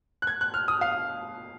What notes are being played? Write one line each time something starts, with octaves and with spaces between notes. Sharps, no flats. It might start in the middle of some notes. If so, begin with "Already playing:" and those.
F#6
G#6
F#6
F6
D#6
F5